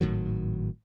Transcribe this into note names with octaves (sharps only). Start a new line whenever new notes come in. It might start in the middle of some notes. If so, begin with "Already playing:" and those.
G#1 A2 D#3 F#3